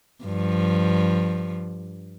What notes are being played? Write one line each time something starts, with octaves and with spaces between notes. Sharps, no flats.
G2 F3